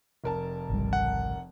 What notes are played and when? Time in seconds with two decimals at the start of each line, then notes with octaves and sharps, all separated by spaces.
0.24 F1 A#4 A5
0.70 G#1 C#2 G3
0.93 F#5